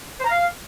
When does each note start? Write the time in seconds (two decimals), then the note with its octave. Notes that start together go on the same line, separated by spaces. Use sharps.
0.20 C5
0.25 A#5
0.30 F5